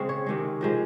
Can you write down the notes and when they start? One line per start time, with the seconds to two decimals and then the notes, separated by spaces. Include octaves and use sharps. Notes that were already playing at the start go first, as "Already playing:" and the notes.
Already playing: C#3 G#3 A#3 C4
0.09 C#5
0.26 C3 D#3 G#3
0.61 F3 G#3 A#4